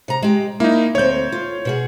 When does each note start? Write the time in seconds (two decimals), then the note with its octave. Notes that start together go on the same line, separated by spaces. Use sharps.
0.08 C3 A#5
0.22 G#3 G4
0.60 A#3 D#4 E4
0.95 D2 C4 C#5 G6
1.32 F4
1.65 B2 F#4 G#4